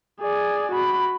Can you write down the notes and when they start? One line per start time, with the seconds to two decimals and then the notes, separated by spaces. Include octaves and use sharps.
0.21 G#4 D5
0.72 F#4 B5